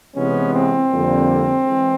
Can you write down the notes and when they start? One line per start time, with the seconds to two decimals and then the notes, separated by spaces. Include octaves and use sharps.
0.15 C3 E3 G#3 B3 C#4
0.52 C4
0.91 F2 D3 G3 A#3
1.66 E3 G#3